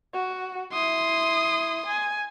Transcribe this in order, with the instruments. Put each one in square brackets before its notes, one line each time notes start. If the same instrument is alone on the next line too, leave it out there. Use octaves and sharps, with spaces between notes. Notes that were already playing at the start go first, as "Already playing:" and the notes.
[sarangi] F#4
[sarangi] E4 [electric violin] C6 D#6
[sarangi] G#5